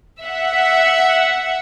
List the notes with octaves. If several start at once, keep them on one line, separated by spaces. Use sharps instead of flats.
E5 F#5